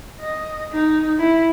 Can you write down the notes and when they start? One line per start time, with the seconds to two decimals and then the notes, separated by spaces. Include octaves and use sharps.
0.20 D#5
0.72 D#4
1.18 E4